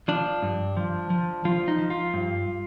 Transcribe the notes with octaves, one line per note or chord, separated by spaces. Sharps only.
F3 D4
G2
F3
F3
F3 F4
D#4
F3
F4
G2